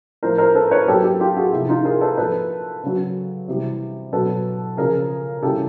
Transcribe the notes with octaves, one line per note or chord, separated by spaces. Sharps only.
A2 F3 A#4 C5
A#4 C5
A4 B4
B4 C#5
A#2 F#3 G4 A4
G4 A4
F4 G4
F#4 G#4
C3 F3 E4
D#4 F4
G#4 A#4
A4 B4
A#2 F3 A4 B4
C#3 F#3
C3 E3 G3
B2 F#3 A4 B4
C#3 F3 G#4 A#4
C#3 E3 G3 G4 A4